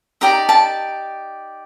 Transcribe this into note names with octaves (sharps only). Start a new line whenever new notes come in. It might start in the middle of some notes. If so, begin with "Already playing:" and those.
D#4 G4 D5 A#5
A5